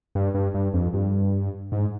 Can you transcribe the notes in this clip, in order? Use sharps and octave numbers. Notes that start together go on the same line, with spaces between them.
G2
G2
G2
F2
G2
G#2